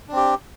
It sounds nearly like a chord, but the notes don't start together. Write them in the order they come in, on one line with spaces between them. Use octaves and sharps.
D4 C4 G4